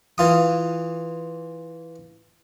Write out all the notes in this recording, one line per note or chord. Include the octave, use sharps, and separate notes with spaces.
E3 F4 D#6